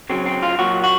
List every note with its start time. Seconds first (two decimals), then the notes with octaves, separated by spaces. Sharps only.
0.10 C#3 F#3 C4
0.26 C4
0.43 F4
0.59 A#2 F#3 F#4
0.84 F#4